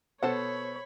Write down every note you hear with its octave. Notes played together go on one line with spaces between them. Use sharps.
B2 B3 A4 C5 C#5 F#5 B5